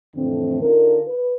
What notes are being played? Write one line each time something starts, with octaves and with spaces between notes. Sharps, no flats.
F2 A2 D3 E3 C4
D3 D4 D#4 F4 A#4
B4